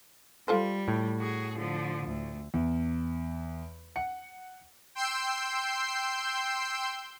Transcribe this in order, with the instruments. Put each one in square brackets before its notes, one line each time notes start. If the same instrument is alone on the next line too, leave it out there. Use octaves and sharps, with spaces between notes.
[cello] G3 [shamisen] F4 A4 C5
[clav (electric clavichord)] A2
[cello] F#4 G#4
D3 F3
D2
[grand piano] E2
F#5 C#7
[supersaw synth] G5 C6 E6 G6 C7